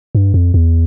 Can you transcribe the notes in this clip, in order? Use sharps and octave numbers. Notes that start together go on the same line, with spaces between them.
G2
F2
E2